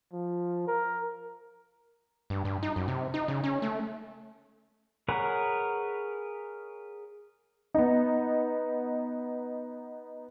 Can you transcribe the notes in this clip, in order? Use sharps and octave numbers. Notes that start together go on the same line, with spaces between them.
F3
A#4
G2
G2
D#4
F#2
C3
D#4
C#3
C#4
A3
G#4 A#4 B4 C#5 F#5
B3 D#4